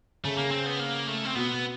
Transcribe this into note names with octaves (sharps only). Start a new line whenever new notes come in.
C#3 A3
A#3
C4
B3
A#3
A3
C4
B2 B3